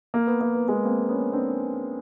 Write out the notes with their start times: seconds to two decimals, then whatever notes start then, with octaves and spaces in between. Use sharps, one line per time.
0.14 A#3
0.27 B3
0.41 A#3
0.55 B3
0.68 G#3 A#3
0.85 A#3 C4
1.09 B3 C#4
1.33 C4 D4